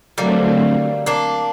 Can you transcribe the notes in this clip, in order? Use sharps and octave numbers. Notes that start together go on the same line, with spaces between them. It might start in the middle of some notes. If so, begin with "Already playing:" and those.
D3 F#3 G3 A3 A#3 C4
A#3 D4